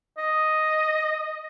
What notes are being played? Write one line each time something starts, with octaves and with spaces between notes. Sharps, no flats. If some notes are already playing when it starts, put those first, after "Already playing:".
D#5